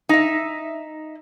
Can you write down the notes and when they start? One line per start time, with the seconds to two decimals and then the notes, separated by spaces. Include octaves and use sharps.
0.09 D#4 E5